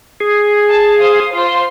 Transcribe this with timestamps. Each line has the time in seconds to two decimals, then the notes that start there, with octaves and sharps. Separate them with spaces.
0.20 G#4
0.68 A5
0.99 C5 F5 D#6
1.33 F4 C5 C6